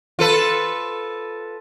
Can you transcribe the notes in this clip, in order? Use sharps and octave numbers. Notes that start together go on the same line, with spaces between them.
F4 A4 B4